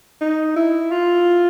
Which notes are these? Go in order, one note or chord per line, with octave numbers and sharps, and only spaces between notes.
D#4
E4
F4